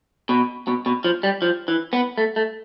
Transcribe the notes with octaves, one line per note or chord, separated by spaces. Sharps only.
B2
B2
B2
F3
G3
F3
E3
B3
A3
A3